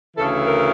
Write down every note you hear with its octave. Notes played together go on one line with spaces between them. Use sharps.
D2 C#3 E3 A4
A#4